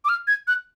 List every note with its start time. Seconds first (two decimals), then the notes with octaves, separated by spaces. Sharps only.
0.05 D6
0.09 F6
0.27 G#6
0.48 F#6